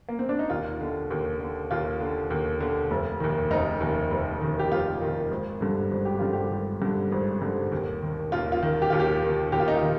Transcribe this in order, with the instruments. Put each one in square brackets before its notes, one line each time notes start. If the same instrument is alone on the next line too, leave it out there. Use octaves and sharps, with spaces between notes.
[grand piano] A#3
C4
D4
D#4
D#2 F4
D3
D#2
D3
D#2 F4
D3
D#2
D3
F1
D#2 D#3
F1 D#4
D#2 D#3
F1
D#2 D#3
G4
F1 F4
D#2 D#3
G#1
G2 D3
G#1
G4
G2 D3 F4
G4
G#1
G2 D3
G#1
G2 D3
D#2
D#3
D#2 F4
F4
D#3
G4
D#2 F4
G4
D#3
D#2 G4
F4
D#4
F4
D#3